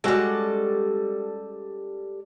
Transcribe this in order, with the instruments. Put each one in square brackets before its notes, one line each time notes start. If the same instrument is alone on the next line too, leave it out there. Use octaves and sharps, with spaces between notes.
[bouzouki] G3 A4 [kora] G#3 C#4 F#4